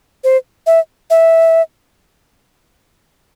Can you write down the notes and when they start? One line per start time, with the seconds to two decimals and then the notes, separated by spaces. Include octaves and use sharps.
0.24 C5
0.67 E5
1.10 E5